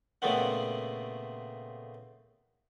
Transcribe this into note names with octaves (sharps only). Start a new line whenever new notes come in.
A#2 C#3 A3 B3 C4 F#5